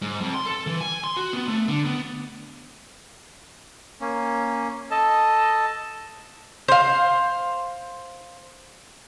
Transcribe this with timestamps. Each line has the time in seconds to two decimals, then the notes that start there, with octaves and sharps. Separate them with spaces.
0.02 G#2
0.21 F2
0.34 C6
0.46 A4
0.67 E3
0.81 G#5
1.04 C6
1.17 F#4
1.33 B3
1.48 A3
1.69 D3
1.85 B3
4.01 A#3 C#4
4.91 A4 D#5 A5
6.68 C5 F5